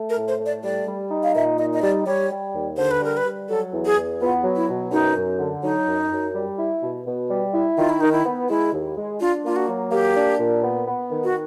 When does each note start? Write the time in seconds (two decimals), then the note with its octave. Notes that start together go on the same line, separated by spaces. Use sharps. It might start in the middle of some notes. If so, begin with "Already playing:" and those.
Already playing: A3
0.10 A#4
0.16 A2
0.28 C5
0.39 A3
0.46 D5
0.63 G3 D5
0.87 G3
1.11 D#4
1.23 F5
1.35 A#2 E5
1.58 D#4 D#5
1.73 D#5
1.82 G3 D5
2.06 G3 C#5
2.31 G3
2.54 D#2
2.77 D3 C5
2.91 B4
3.01 G3 A#4
3.17 B4
3.25 G3
3.49 F#3 A4
3.73 E2
3.85 G#4
3.96 E2
4.20 B3 F4
4.44 F#3
4.56 E4
4.68 B2
4.92 F#2 D#4
5.15 F#2
5.39 D3
5.63 F#3 D#4
5.87 F#2
6.11 F#2
6.34 G3
6.58 E4
6.82 B2
7.07 B2
7.29 G3
7.54 E4
7.78 D#3 F4
7.89 E4
8.00 D#3 D#4
8.12 E4
8.25 B3
8.49 G#3 E4
8.73 D#2
8.96 G#3
9.20 D4 F4
9.45 A#3 F4
9.56 F#4
9.67 F#3
9.91 A#3 G4
10.15 D4
10.39 A#2
10.63 B3
10.87 B3
11.11 D#3
11.24 F#4